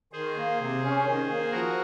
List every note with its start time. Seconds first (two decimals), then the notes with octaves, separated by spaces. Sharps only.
0.12 D#3 G#4 C5
0.36 A#3
0.60 C3
0.83 C#4
1.05 D#3
1.29 A#3
1.52 F3 F#4 A#4